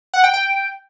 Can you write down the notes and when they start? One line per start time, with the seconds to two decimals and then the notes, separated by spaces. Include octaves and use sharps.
0.14 F#5
0.24 G5
0.34 G5